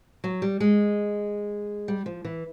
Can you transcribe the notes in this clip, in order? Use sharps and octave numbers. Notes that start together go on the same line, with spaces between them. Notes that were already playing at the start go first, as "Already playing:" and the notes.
F#3
G3
G#3
G3
F3
E3